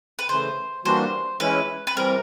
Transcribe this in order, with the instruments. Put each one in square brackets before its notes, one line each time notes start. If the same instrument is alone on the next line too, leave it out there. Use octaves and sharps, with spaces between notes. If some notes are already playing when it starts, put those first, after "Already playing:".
[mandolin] B4
[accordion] C#3 E3 A3 [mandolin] C5
[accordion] E3 G3 A#3 D4 F#4 [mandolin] C5
[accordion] E3 G#3 C#4 E4 [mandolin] B4
[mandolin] B4
[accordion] C3 E3 G3 C4 [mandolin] A#4